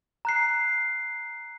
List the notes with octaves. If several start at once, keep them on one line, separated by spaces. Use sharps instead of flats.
A#5 F#6 C7